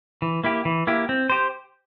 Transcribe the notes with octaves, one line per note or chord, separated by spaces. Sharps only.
E3
A#3 E4 G4
E3
A#3 E4 G4
C4
G4 C5